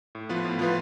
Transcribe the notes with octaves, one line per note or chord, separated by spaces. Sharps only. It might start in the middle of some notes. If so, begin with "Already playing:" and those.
A2
F3 B3 F4 B4
A2
F3 B3 F4 B4